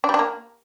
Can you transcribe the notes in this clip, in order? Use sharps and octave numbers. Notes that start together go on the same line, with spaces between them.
D4
G3
D4
A#3